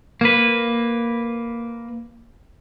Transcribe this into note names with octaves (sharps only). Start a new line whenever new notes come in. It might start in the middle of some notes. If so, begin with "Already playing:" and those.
A#3 B4